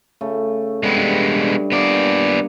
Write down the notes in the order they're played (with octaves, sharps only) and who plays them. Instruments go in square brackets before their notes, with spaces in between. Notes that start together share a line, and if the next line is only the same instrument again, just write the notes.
[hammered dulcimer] C#3 A3
[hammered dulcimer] G2 G3 [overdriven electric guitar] G#3 B3
[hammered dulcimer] A#3 D#5 D6 [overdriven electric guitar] B3 D5